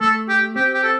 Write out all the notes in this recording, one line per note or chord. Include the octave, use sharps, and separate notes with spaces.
A3 A4
G4
C4 G4
G4
A4